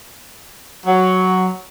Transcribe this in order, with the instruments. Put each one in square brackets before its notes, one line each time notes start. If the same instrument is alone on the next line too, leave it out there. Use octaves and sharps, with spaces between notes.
[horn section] F#3